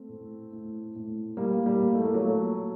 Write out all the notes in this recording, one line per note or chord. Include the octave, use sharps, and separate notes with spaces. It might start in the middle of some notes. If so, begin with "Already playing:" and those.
Already playing: A3 C4
A2
A2
A2
A2 G3 A#3
G3 A#3
A2
A3
A#3
F#3 A3
A#2